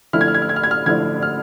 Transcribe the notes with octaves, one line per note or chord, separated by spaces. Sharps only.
D3 F3 A3 E4 F6
G#6
F6
G#6
F6
G#6
F6
G#6
F6
D3 F3 A3 E4 G#6
F6